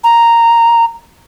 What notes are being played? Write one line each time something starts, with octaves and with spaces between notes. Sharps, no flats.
A#5